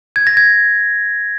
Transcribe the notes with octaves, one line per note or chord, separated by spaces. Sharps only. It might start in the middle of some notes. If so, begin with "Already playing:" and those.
G#6
A#6
G#6